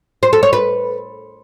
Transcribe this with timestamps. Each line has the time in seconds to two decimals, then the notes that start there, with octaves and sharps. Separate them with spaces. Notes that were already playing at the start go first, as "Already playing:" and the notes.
0.23 C5
0.33 A4
0.43 C#5
0.53 B4